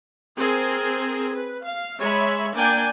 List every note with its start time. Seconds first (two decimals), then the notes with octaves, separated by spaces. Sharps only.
0.37 C4 G#4 A#4
1.32 B4
1.62 F5
1.99 G#3 C#5 E5 B5
2.54 A#3 D4 D5 G5 G#5